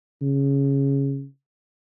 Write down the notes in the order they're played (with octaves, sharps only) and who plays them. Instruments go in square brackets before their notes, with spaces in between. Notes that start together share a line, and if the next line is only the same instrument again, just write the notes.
[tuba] C#3